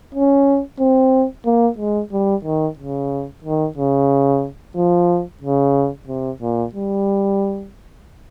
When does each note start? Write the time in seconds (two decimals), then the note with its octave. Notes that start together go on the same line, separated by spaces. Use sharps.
0.15 C#4
0.80 C4
1.46 A#3
1.79 G#3
2.12 G3
2.45 D#3
2.79 C#3
3.44 D#3
3.78 C#3
4.76 F3
5.43 C#3
6.08 C3
6.42 A#2
6.75 G3